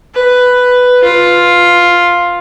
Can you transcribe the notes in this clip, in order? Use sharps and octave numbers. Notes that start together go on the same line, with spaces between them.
B4
F4